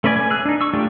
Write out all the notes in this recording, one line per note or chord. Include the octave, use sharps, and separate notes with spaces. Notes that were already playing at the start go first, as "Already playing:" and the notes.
A3 C#4 B4 D5 G#5
G#5
G#4 E6 F#6
D4 D#4
C#6 E6
A3 D4 F4 G4 D5